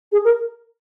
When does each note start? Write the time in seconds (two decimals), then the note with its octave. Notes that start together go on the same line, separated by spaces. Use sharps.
0.12 G#4
0.24 A#4